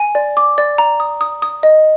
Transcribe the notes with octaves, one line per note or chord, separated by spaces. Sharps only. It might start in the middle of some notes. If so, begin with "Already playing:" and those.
Already playing: G#5
D5
D6
D5
A#5
D#6
D#6
D#6
D#5